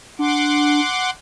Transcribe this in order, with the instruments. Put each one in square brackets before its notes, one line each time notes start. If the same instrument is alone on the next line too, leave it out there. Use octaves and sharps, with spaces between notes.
[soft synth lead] D4 [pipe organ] F#5 C6 D6